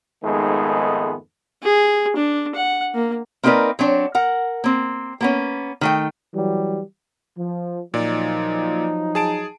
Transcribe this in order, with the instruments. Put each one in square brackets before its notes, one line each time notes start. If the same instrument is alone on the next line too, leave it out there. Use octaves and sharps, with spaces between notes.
[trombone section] F2 G#2 D#3 G#3 A3 B3
[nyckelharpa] G#4
D4
F#5
A#3
[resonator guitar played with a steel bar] A#3 C4 D#4 A#4 B4 D5
F#3 C4 D4 C#5
A#4 F#5
A#3 C4
A#3 B3 C#4
D#3 A3 G5
[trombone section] E3 F#3 G3
F3
[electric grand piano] A#2 D5 [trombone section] F3 F#3 D#4
[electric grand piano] G#4 A5 D7